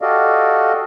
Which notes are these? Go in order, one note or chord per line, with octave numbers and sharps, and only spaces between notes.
F#4 G4 A4 D5 D#5 F5